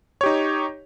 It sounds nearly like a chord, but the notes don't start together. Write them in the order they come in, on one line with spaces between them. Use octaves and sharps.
C#5 G4 D#4